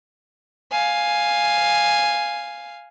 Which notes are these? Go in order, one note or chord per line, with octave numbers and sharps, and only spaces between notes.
F5 G#5